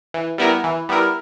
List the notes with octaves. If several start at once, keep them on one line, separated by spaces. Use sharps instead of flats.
E3
G3 B3 E4 A#4
E3
G3 B3 E4 A#4